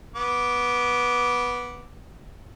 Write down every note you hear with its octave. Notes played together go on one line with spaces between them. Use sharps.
B3 D6